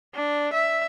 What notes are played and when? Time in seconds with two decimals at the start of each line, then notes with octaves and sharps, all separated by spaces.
0.14 D4
0.53 E5